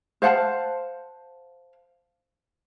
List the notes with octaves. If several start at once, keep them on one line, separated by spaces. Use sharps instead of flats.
C5 F5 F#5 A5